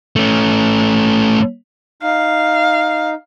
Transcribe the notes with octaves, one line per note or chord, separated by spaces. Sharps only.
A3 C#4
D#4 F5